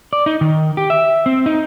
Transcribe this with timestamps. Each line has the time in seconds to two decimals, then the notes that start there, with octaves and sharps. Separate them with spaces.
0.13 D5
0.26 D#4
0.41 D#3
0.77 G4
0.90 E5
1.26 C4
1.46 D#4